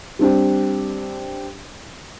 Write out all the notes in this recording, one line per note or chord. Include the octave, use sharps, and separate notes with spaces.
G3 C4 D4 G4